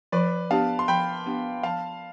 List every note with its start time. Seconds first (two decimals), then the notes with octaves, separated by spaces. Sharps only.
0.12 F3 B4 D5
0.50 B3 D4 G4 F5 A5
0.79 C6
0.88 F3 G5 B5
1.26 B3 D4 G4
1.63 F3 F5 A5